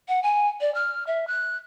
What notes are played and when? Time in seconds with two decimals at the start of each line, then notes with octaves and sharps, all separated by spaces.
0.08 F#5
0.23 G#5
0.61 D5
0.75 F6
1.07 E5
1.27 F#6